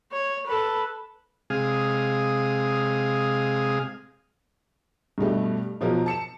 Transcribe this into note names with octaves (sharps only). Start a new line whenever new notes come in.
C#5
A4 B4
C3 G#3 G#4 F5 D#6
G2 B2 G3 A3
B2 F3 F#3 A#4
A5 C#7 E7